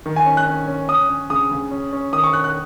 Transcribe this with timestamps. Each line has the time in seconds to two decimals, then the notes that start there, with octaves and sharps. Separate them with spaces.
0.06 D#3
0.16 G#5
0.26 C#4
0.37 F#6
0.47 C#4
0.68 C#4
0.89 C#4 D#6
1.09 C#4
1.30 C#3 D#6
1.52 C#3
1.71 C#4
1.93 C#4
2.13 D#3 D#6
2.24 C#6
2.33 C#4 F#6
2.44 F#6